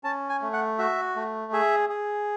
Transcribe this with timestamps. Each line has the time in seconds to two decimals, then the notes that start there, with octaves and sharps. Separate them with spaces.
0.04 C#4 A5
0.29 G#5
0.42 A3
0.53 F#5
0.78 F#4 E5
1.16 A3
1.52 G#4 E5
1.89 G#4